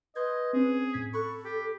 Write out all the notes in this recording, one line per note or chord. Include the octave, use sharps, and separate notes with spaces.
B4 D#5 C6 G6 G#6
C4 C#4 G#4
A2 G#6 B6
A4 B5 C#6 F#6
G4